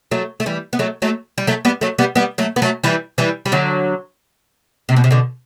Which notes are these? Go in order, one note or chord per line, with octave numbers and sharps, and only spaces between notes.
F#3 A3
A3
E3 G3
B3
F#3 A3
F#3 A3
G3
F#3 A3
G3 B3
F#3 A3
G3 B3
G3 B3
F#3 A3
B3
F#3 A3
E3 G3
E3 G3
G3
D3 F#3
C3
B2
C3
B2 D3